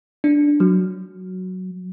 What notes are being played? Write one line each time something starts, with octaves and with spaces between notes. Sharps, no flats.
D4
F#3